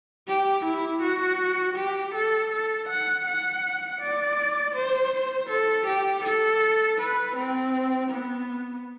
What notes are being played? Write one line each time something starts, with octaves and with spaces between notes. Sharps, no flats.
G4
E4
F#4
G4
A4
A4
F#5
F#5
D5
C5
A4
G4
A4
B4
C4
B3